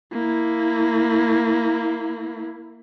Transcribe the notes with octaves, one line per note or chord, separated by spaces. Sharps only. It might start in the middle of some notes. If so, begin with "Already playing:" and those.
A#3 E4